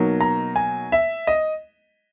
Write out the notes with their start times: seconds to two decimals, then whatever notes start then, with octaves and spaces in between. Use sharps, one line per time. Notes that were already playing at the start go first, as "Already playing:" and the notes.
Already playing: B2 F#3 A#3 D#4
0.21 A#5
0.56 G#5
0.92 E5
1.27 D#5